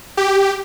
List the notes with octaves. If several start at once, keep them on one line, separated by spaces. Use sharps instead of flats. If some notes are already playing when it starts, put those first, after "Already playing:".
G4